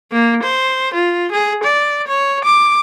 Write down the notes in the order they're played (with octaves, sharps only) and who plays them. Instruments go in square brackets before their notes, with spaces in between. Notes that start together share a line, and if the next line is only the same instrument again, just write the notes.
[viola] A#3
C5
F4
G#4
D5
C#5
D6